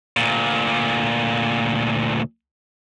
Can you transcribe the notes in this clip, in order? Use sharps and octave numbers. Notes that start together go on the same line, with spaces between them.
D2 A#2